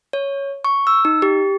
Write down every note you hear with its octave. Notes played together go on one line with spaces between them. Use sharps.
C#5
C#6
E6
D#4
G4